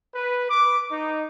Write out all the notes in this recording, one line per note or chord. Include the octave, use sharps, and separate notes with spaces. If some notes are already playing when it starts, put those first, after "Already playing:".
B4
D6
D#4